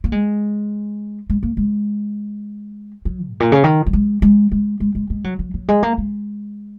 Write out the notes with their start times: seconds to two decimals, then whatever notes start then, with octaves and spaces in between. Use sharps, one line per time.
0.04 A#3
0.12 G#3
1.30 G#3
1.43 A#3
1.57 G#3
3.05 F#3
3.28 G#2
3.40 A#2
3.52 C#3
3.64 D#3
3.86 F#3
3.93 G#3
4.22 G#3
4.52 G#3
4.80 G#3
4.95 G#3
5.10 G#3
5.24 F#3
5.39 F#3
5.54 F#3
5.68 G#3
5.83 A#3
5.98 G#3